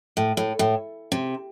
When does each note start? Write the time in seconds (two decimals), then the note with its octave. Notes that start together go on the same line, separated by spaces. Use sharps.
0.17 A2
0.37 A2
0.59 A2
1.12 C3